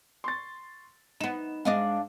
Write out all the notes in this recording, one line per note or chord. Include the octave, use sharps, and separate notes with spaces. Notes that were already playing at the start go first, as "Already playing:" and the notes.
C6 C#6 A6
B3 D#4 E7
G#2 G#3 D4 D#5 F5